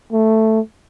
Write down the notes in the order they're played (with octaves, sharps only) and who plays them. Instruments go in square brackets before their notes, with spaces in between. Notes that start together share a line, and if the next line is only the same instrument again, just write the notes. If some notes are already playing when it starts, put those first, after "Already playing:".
[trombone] A3